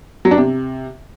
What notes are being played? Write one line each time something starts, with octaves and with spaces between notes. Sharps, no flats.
F#3
D4
C3